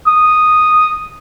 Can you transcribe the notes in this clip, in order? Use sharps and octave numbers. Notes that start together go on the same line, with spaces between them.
D#6